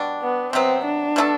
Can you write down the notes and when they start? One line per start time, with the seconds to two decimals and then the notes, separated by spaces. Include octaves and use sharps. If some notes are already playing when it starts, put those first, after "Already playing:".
Already playing: B2 G3 D4
0.22 B3
0.53 C3 F#3 B3 C4
0.85 D4
1.16 B2 A3 E4 A4